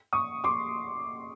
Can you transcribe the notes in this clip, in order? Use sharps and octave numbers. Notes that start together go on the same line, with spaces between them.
C#6 D#6
C6 D6